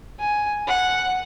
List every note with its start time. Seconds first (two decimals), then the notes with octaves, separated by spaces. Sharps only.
0.19 G#5
0.67 F#5